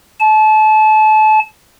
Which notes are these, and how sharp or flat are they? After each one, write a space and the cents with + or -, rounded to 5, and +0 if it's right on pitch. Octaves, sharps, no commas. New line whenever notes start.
A5 -30